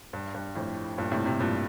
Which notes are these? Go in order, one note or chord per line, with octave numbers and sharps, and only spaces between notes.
G2
G2
F2 A2
G2 A#2
A2 C3
A2 C3
G2 A#2